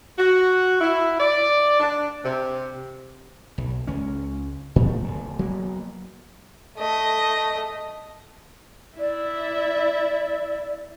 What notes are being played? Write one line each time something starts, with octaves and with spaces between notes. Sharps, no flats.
F#4
E4
D5
D4
C3
B1
C#2 C#4
A2 F3 G3 A3
D1
F#3 A#3 B3
A3 D#5
E4 D5 E5